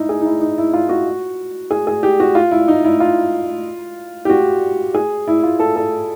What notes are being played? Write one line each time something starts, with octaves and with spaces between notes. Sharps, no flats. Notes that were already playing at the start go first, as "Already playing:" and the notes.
Already playing: D#4 E4
G#4
D#4
E4
D#4
E4
F4
F#4
G#4
G#4
G4
F#4
F4
E4
D#4
E4
F4
G4
F#4
G#4
E4
F4
A4
A4